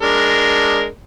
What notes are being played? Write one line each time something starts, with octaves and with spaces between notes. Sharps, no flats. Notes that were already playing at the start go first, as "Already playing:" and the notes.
G#3 D4 A#4